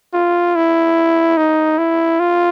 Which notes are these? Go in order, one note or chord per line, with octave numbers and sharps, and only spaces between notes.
F4
E4
D#4
E4
F4